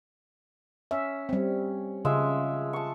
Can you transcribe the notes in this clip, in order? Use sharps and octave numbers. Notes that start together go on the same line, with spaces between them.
C#4 E5
G3 C4
C#3 F3 G#3 E5
A5 C#6